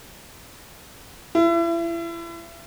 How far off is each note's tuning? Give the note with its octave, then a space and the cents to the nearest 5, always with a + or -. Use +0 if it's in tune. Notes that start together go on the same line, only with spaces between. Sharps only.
E4 +35